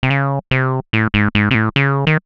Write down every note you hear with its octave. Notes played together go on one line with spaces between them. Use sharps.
C3
C#3
C3
A2
G#2
G#2
C3
A2
C#3
D#3